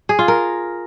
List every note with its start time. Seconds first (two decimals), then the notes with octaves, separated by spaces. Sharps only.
0.09 G#4
0.19 F4
0.28 A#4